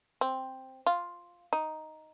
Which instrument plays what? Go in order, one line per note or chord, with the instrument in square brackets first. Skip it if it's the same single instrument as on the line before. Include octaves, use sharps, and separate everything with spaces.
[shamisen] C4
F4
D#4